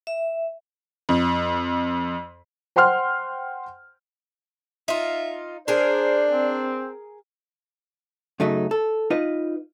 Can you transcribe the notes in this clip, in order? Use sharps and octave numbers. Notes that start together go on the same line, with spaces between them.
E5
F2
C5 F#5 G5 C6 F6
D#4 F4 E5
D4 G#4 A#4 C5 D5
C4
F#2 C#3 F#3 A3 D#4
A4
D#4 F4 B4 D#5